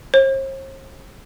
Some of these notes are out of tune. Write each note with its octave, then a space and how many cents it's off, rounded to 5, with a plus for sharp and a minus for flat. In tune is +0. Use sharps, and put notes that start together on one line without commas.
C5 +45